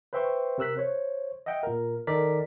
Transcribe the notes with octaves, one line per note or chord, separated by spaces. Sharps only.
B4 C5 E5 G5 C6 C#6
C3 A#4 E6 F#6 B6
C5 C#5
D#5 E5 F#5 G5
A#2 A#4
D#3 D#4 A4 A#4 D5 B6